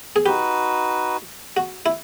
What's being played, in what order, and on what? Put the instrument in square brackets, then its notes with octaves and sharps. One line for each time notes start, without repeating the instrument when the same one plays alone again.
[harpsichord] G#4
[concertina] D#4 F#4 B4 [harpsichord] G4
[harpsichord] F#4
E4